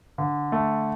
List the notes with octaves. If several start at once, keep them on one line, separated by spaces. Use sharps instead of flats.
D3
A3